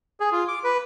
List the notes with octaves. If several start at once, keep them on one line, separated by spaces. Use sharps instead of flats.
G#4
F4
D6
B4